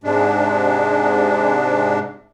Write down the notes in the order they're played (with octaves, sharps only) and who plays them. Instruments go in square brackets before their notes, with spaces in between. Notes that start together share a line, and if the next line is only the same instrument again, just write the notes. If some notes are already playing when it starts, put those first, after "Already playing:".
[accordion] G#2 C3 G#3 D4